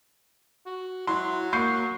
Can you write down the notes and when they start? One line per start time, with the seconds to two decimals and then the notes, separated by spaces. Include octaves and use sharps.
0.66 F#4
1.07 F#3 E4 C6
1.53 A#3 C#6 G6 C7